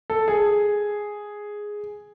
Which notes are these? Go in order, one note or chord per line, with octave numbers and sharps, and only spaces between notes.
A4
G#4